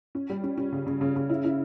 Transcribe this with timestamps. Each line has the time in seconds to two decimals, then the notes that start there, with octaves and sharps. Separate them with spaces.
0.15 C#4
0.30 G3
0.44 C#4
0.58 C#4
0.73 C#3
0.87 C#3
1.01 C#3
1.16 C#3
1.30 E4
1.44 E4